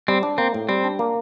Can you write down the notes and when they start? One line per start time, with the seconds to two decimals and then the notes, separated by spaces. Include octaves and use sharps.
0.08 G3 C4
0.23 D4
0.38 A#3 C4
0.54 A2
0.69 G3 C4
0.84 D4
0.99 A#3